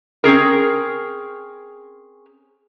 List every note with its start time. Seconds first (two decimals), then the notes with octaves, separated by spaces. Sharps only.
0.24 C4 C#4 G#4 A#4